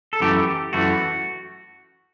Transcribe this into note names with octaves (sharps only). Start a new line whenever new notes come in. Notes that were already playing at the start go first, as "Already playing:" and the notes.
A4
F#2 E3 A3 G4
F#2 E3 A3 F#4